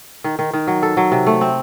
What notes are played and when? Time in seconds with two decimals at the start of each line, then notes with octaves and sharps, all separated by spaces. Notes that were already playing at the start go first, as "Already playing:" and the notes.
0.24 D#3
0.39 D#3
0.53 D#3
0.67 F#3
0.83 A4
0.97 F#3
1.12 C3
1.27 A3
1.41 C4